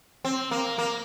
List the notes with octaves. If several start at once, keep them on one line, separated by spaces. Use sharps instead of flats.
C4
A#3
A#3